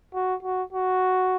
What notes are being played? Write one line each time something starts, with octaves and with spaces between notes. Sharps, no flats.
F#4
F#4
F#4